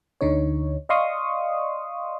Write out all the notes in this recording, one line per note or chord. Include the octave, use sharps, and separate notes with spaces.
D2 D3 D#4 C#5
D5 D#5 F5 C6 C#6 D#6